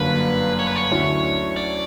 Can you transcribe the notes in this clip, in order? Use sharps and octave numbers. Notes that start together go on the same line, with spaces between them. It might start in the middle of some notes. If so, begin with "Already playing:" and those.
Already playing: G1 F#2 D3 A#3 B4
C#5
B4
C#5
D2 D3 F#3 C#4 E4
D5